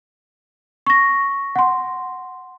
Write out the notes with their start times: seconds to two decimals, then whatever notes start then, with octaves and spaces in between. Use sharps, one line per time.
0.87 C#6 A#6
1.56 F#5 C6